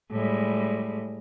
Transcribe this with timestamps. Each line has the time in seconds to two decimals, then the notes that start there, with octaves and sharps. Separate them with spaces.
0.11 A2 G3 G#3